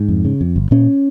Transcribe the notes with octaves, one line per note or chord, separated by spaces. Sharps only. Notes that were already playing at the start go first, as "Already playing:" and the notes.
Already playing: G#2
F2
C#3
F2
G1
A#2 C#4